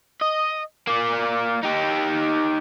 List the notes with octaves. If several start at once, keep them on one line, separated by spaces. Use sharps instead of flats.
D#5
A#3 D5
D#4 G4